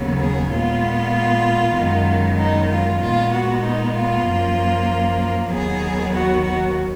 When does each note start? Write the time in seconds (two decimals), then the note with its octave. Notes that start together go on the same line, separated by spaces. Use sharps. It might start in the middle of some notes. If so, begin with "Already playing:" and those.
Already playing: D#2 C#3 F#3 B3
0.20 G#4
0.51 A#2 G#3 B3 F4
1.76 F#2 D#3 G#3 B3
2.38 D#4
2.70 F4
3.01 A#2 G#3 B3 F4
3.32 F#4
3.63 D#4
3.94 F4
4.25 F#2 F3 A#3
5.50 D#2 D#3 F#3 B3 G#4
6.13 F#4
6.43 F#4